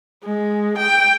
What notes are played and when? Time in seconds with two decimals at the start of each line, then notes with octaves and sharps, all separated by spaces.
0.24 G#3
0.78 G5